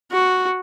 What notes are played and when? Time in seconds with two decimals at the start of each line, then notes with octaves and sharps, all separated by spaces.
0.12 F#4